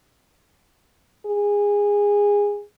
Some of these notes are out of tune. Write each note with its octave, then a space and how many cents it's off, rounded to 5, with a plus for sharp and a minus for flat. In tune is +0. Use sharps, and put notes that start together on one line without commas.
G#4 -20